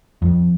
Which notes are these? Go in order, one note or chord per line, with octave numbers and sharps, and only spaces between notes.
F2